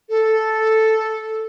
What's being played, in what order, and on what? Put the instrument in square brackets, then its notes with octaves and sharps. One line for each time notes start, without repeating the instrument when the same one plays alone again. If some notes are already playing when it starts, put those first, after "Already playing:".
[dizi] A4